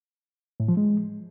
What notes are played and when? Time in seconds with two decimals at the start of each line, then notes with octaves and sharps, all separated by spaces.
0.60 A2
0.68 F3
0.77 G#3